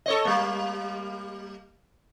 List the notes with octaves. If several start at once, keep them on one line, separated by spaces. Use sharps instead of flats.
A4 C#5 D#5
G3 A#3